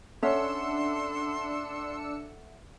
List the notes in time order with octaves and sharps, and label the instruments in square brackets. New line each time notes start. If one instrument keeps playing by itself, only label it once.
[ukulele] C#4 [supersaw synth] D4 E6 C#7 [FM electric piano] A4 E5 F#5 [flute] C6